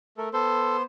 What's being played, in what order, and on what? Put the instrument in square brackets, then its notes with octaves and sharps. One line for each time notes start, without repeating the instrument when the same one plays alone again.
[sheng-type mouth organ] A3 A4 A#4
[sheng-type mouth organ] B3 C5 C6 [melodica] A4